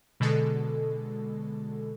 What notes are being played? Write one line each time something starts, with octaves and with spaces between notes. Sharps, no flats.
B2 D3 G#3 A4